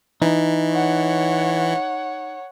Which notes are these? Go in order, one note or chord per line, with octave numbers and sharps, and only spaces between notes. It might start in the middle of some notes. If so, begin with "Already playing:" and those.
E3 D#4
C#5 F#5